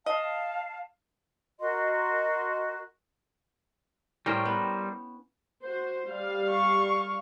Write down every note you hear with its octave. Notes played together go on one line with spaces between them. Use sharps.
D#5 F5 A5
F#4 A#4 D#5 C6
A2 G3 C#4 A#4 C5 G5
B3
F#4 C5
G3 F5
C#6